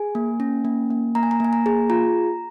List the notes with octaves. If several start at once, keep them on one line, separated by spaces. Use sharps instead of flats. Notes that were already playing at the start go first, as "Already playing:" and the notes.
Already playing: G#4 G#5
A#3
C#4
A#3
A#3
A#3 A#5
G#5
A#5
A#3 G#5
A#5
G#4
F4 A#5